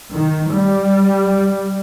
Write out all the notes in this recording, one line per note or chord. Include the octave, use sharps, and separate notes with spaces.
D#3
G3